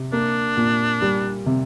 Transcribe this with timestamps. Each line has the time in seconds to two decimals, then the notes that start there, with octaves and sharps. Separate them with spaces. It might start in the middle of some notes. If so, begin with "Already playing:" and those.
Already playing: C3
0.12 A#3 D4
0.57 A#2
1.02 G3
1.46 C3